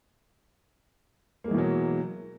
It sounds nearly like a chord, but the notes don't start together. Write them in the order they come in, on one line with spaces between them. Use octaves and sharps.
A#3 G#3 E3 B2 F#3